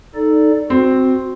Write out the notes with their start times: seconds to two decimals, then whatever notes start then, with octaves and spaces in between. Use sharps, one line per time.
0.15 D#4 A4 D5
0.70 C4 F#4